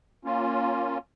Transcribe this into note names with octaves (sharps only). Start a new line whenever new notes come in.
A#3 C#4 F4